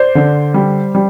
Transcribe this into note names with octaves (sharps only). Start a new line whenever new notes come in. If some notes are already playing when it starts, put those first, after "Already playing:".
Already playing: C5 D5
D3
G3
G3